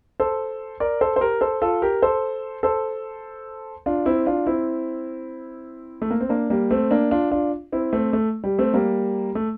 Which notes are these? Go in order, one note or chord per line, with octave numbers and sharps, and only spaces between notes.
A4 C5
A#4 D5
A4 C5
C5
G4 A#4
A4 C5
F4 A4
G4 A#4
A4 C5
A4 C5
D4 F4
C4 E4
D4 F4
C4 E4
A3
A#3
C4
A#3 D4
G3 A#3
A3 C4
A#3 D4
D4 F4
D4 F4
C4 E4
A3 C4
A3
G3
A3 C4
G3 A#3
A3